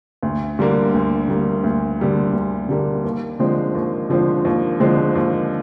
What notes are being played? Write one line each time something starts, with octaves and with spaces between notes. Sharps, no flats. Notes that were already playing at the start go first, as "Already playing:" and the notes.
D2
D3 G3 A#3
D2
D3 G3 A#3
D2
D3 G3 A#3
D2
D3 G3 A#3
D#2
D3 F3 G#3 C4
D#2
D3 F3 G#3 C4
D#2
D3 F3 G#3 C4
D#2